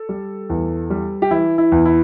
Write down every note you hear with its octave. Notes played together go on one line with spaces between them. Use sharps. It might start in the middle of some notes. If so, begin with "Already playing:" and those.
Already playing: A4
G3
E2
G3
G4
E3 E4
E4
E2
E4